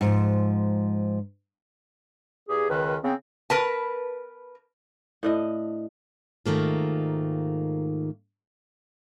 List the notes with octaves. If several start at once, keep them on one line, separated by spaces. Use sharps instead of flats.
G#2 F3
E2 G4 G#4
C#2 D#3 B4
C#3 B3 C4
A#4 B4 A5
A2 D4 D#5
G#2 D#3 A3 A#3 F4